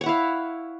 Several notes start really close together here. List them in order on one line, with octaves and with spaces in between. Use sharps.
C#5 F#5 E4 F5